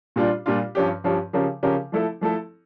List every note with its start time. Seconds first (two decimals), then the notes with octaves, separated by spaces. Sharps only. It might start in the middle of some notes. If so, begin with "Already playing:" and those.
0.16 A#2 G3 D4 F4
0.46 A#2 G3 D4 F4
0.75 G2 F3 C#4 G4
1.04 G2 F3 C#4 G4
1.33 C#3 F3 C#4 G4 A#4
1.63 C#3 F3 C#4 G4 A#4
1.92 F3 A3 E4 A4
2.21 F3 A3 E4 A4